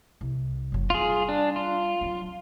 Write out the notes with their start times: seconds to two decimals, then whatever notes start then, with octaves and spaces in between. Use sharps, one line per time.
0.21 C2
0.72 F#1 F#3
0.90 G3 F4 G#4
1.29 D4
1.56 F4
2.01 F#3 C4